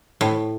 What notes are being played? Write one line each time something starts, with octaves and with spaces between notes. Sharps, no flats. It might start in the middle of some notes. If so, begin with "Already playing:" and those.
A2